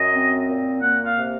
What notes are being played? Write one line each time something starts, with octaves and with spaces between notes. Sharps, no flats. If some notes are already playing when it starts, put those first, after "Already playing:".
Already playing: F#2 D#5
C4
A#2
A#3 F#5
F5
C3